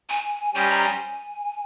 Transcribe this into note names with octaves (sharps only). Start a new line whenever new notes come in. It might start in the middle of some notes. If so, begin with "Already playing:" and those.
G#5
G3 C#4 G4 C5 D#5 G#5
A#5
G#5